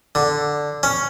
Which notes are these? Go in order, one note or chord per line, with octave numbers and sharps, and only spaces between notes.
D3
C#4